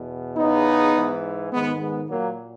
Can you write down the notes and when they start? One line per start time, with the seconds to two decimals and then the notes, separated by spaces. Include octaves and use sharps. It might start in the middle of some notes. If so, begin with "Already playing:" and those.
Already playing: E2 B2
0.36 E2 C#3 E3 B3 D#4
0.94 G#2 E3
1.52 G#2 D#3 G#3 B3
1.80 G#3 B3
2.09 A#2 F#3 A#3